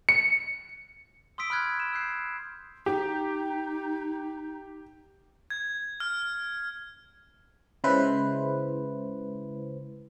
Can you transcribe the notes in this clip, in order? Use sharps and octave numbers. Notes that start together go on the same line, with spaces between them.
C#7
C6 D#6 E6 B6 D7
B5 F6 F#6 G#6
E7
E6 F#6 G6 C7
D#4 G4
G#6
F6
C#3 G#3 E4 B4 C5